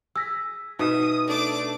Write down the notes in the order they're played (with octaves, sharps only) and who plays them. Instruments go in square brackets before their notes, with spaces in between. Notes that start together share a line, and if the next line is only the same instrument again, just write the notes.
[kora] G#4 [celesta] E6 A#6 B6
[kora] B2 E5 [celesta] D#4 [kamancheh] D#6
[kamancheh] A3 [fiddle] D4 D6